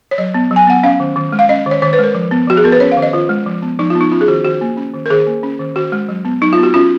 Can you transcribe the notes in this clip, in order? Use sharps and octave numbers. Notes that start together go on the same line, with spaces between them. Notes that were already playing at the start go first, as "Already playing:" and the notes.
C#5
F#3 D#5
B3
F#3
G#5
B3 F#5
C#4 F5
D#3
D#3
G#3
F5
C#4 D#5
D#3
C#5
D#3 C#5
B4
G#3 A#4
F3
B3
F3 F#4
G#4
B3 A#4
B4
C#4 C#5
F5
D#3
D#5
D#3 F4
G#3
F3
B3
F3 D#4
B3 F4
D#4
C#4 F4
G#4
D#3 F#4
D#3 F#4
A#3
C#4
D#3
A#4
D#3 G#4
A#3
C#4
D#3
D#3 F#4
G#3
F#3
B3
F#3 D#4
F4
B3
F#4
C#4 F4